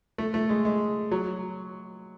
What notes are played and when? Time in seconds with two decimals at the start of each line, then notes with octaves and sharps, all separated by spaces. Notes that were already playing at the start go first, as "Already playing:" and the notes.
0.18 A3
0.34 A3
0.49 G#3
0.65 G#3
1.12 F#3